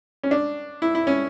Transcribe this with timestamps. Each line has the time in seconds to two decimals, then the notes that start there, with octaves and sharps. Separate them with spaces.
0.24 C#4
0.31 D4
0.82 E4
0.95 E4
1.07 C#4